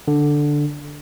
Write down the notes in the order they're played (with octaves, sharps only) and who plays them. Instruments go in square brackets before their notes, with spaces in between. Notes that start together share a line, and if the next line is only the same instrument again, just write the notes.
[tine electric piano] D3